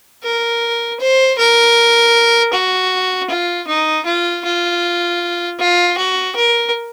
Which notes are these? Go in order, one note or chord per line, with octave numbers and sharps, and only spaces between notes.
A#4
C5
A#4
F#4
F4
D#4
F4
F4
F4
F#4
A#4